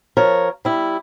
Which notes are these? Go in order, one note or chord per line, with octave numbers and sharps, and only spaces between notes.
F3 A#4 C#5
G3 E4